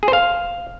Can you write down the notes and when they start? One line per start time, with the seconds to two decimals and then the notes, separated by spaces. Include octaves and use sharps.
0.03 G#4
0.08 C5
0.13 F5